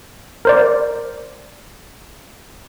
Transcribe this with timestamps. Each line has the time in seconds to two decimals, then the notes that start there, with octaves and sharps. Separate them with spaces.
0.45 A#4 C5 D5